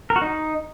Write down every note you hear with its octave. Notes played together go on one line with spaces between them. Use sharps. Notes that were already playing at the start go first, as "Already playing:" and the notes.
A#4
F#4
D#4